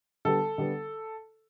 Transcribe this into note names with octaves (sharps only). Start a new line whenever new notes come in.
D3 G3 B3 A4
D3 G3 B3